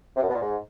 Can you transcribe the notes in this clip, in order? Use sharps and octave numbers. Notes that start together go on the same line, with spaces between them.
C3
F#2
B2
A#2
G#2